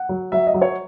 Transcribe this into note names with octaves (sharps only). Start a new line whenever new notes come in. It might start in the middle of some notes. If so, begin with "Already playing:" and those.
Already playing: F#5
F#3
F#3 E5
D#5
F#3
C#5